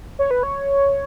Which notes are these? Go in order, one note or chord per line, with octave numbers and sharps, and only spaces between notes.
C#5
B4
C#5